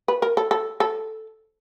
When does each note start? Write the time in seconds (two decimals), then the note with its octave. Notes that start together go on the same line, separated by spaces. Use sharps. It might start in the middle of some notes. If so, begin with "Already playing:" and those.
0.08 B4
0.22 A#4
0.37 A4
0.51 A4
0.80 A4